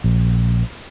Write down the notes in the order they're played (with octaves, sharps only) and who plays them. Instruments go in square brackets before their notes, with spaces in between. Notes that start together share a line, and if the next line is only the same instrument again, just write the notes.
[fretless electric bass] A#1